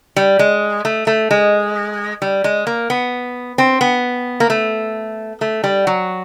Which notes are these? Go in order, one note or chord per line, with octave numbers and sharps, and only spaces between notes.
G3
G#3
A3
A3
G#3
G3
G#3
A#3
B3
C4
B3
A#3
A3
A3
G3
F#3